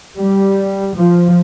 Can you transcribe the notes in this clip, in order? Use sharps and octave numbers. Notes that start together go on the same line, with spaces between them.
G3
F3